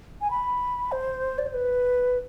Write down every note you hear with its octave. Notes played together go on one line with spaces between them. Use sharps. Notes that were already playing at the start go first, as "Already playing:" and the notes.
G#5
B5
C5
D5
C5
B4